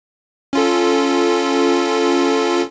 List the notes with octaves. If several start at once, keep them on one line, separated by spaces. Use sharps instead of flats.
C#4 F4 A4